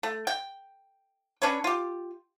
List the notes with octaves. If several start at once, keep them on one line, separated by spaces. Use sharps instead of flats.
A3
G5
C#4 D4 B4 C#5
F4 G4